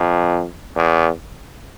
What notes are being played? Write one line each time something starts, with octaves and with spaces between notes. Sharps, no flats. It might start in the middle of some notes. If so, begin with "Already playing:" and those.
Already playing: F2
E2